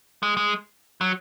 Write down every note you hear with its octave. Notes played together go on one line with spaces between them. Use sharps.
G#3
G#3
F#3